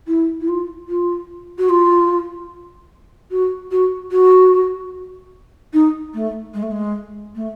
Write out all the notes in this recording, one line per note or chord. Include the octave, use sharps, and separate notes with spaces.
E4
E4
F4
F4
F#4
F4
F#4
F#4
F#4
D#4
A3
G#3
A3
G#3
A3